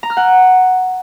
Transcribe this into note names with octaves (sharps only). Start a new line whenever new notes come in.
A#5
F6
F#5